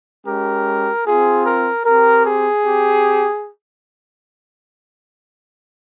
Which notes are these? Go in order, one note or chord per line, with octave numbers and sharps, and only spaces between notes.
G#3 C#4 G4 A#4
C4 F4 G#4
A#4
C4 G4 A#4
G#4
C4 G4